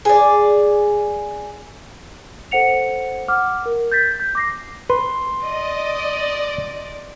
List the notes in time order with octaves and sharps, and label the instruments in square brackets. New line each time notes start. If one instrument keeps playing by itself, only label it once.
[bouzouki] G#4 D5
[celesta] A4 C5 F#5 C#7 F7
F#5 D6 F6
A#4
G6 A6 B6
G6
D6 A#6 C7
[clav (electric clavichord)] B4 [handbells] C6
[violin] D5 D6 [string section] D#5